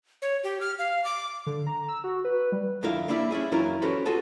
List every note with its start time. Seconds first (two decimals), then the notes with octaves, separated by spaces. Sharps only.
0.22 C#5
0.44 G4
0.61 F6
0.79 F5
1.04 D6
1.46 D3
1.67 A#5
1.89 E6
2.04 F#4
2.25 B4
2.52 G3
2.83 F2 D3 E4 A#4 F5
3.08 G3 A#3 D4 E4 F#4 G4
3.31 C#4 D4 E4 G#4
3.52 F#2 E3 F#3 E4 F4 A#4
3.82 C#4 F#4 G4 A4 B4 C5
4.05 F4 F#4 G#4 A4 A5